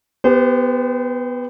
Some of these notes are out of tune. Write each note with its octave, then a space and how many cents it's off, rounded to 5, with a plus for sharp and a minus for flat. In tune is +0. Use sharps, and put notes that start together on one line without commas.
B3 +0 G4 +20 C5 -35